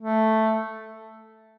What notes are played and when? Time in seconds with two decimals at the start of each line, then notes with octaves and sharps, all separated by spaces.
0.01 A3